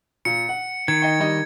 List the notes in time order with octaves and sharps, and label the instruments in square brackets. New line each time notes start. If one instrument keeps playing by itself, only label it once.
[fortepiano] A#2 [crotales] C#7
[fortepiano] F#5
[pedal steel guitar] D#3 [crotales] G#6
[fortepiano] D#5 G5
G3 D#4 D#5